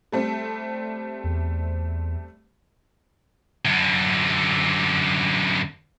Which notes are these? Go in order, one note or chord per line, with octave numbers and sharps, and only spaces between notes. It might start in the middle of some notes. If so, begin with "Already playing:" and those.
G3 A3 C4
E2
F#2 D3